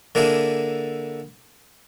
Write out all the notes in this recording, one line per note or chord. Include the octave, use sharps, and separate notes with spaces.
D3 A#3 D4 E4 G#4